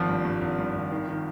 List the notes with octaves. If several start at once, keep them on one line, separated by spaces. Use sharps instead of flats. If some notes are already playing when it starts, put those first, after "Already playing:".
Already playing: G#1 F3 F4
G2
G2
G#1
G2
G#1
D#3
D#3